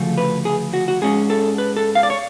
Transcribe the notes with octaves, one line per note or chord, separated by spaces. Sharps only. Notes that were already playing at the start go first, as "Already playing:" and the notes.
Already playing: D2 C#3 F3 A3
B4
G#4
F#4
F#4
G#2 G#3 C#4 G#4
A4
B4
A4
F5
D5
C#5